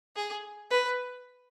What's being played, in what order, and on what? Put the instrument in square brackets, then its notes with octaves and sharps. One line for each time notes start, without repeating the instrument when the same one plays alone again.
[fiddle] G#4
B4